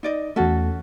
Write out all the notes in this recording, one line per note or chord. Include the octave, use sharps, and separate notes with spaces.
D#4 D5 D#5
E2 A3 C#4 F#4 A4